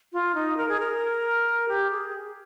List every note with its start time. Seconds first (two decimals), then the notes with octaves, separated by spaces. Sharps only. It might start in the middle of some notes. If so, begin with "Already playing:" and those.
0.13 F4
0.35 D#4
0.57 A#4
0.69 G#4
0.80 A#4
1.69 G4
1.91 G#4